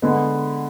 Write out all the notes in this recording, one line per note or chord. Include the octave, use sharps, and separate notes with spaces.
D3 G#3 B3